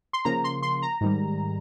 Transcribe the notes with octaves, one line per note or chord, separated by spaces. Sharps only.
C6
C#3 F3 A#3 A#5
C6
C6
A#5
G#2 D#3 G3